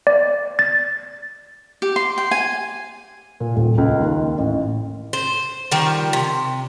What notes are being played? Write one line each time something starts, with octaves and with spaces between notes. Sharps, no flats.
D5
A6
G4
C6
G5
G#5
A#2
D#1
C#2
D#2
A1
C5
D#3 F3 G3
C3